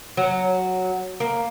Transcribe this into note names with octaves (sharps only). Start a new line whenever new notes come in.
F#3
A#3